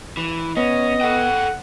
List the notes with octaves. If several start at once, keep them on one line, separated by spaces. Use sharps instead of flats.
E3
B3 C#4 D#5
A4 F#5 G5